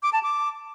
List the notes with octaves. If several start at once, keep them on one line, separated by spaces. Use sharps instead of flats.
D6
A5
D6